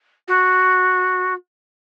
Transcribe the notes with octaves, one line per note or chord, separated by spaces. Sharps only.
F#4